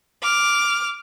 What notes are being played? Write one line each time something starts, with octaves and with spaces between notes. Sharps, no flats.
D6 F6